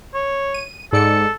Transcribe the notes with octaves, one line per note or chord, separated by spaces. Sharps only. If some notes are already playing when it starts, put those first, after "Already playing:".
C#5
D#7
G#2 A4 D5 C#7